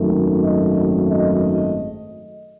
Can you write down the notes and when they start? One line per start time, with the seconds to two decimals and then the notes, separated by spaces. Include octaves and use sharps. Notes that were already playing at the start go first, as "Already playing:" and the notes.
Already playing: G#1 F#2 D#3 A3
0.43 D#5
1.10 D#5